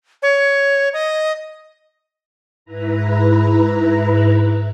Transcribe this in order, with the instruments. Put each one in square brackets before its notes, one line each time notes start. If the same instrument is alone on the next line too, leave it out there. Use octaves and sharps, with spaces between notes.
[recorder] C#5
D#5
[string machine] G#2 E4 B4 A#5